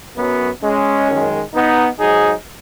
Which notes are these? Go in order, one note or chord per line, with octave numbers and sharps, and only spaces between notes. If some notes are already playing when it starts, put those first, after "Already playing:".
F#2 F#3 B3
G#3 C#4
F#2 D#3 G#3
B3 D#4
G#2 F#3 D#4 G#4